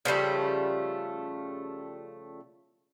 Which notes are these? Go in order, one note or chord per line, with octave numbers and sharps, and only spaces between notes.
C#3 F3 G3 A3